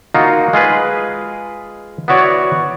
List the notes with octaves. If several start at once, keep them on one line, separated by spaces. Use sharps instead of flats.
A#3 D#4 F4 F#4
G#3 F4 G#4 B4
B3 E4 F#4 C#5 D5